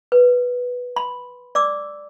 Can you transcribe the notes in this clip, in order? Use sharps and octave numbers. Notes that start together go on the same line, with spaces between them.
B4
B5 C6
D5 D6 E6